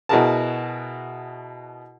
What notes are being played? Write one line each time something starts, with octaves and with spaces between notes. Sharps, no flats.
B2 E4 F#4 G#4 A#4 A5